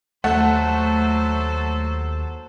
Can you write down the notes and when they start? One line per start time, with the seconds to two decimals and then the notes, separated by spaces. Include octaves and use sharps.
0.24 D#2 F#3 A3 A4 C5 F#5